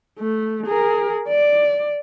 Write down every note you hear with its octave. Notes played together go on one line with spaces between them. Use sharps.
A3
G#4 A#4
D5